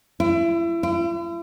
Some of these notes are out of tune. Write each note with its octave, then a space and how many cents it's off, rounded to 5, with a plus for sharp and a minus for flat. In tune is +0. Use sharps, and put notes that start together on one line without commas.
E4 +30
E4 +45